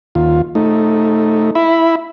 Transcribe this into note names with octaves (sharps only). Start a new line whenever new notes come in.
D#2 F4
A3 D#4
E4 E5 B5